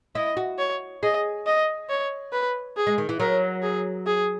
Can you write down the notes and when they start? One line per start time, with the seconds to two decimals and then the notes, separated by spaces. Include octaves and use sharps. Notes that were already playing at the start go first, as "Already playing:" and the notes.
0.15 E4 D#5
0.37 F#4
0.58 C#5
1.03 G#4 D#5
1.46 D#5
1.89 C#5
2.32 B4
2.77 G#4
2.87 G#3
2.98 D#3
3.09 E3
3.20 F#3 A#4
3.62 G#4
4.07 G#4